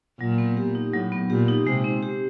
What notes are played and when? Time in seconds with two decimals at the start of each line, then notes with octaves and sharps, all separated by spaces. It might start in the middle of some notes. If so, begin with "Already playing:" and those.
0.20 A#2 F#3
0.38 B3
0.57 G4
0.75 D#4
0.93 A2 F#3
1.12 B3
1.30 A#2 G4
1.48 D#4
1.67 C3 G#3
1.84 C4
2.02 G4